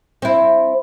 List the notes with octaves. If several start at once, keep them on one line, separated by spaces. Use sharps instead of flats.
C4 E4